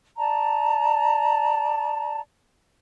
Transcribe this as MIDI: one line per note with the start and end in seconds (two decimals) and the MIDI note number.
0.18 2.20 74
0.18 2.20 81
0.18 2.20 82